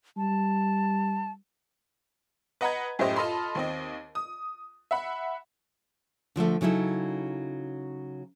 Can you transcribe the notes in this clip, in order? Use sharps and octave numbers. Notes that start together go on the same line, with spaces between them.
G3 A5
B4 D#5 F#5 A#5 B5 G#6
F#2 A2 E4 G4 C5 D#5
F4 A4 D#5 A5 B5 C6
D#2 C4 D#5
D#6
E5 F#5 B5
D3 F3 G#3 A3
C#3 F#3 D#4 E4 A4